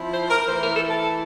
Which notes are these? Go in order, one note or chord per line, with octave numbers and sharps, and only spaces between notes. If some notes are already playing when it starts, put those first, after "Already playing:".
Already playing: F3 C4 E4
C5
A#4
E3 A3 E4 C5
A#4
A4
A4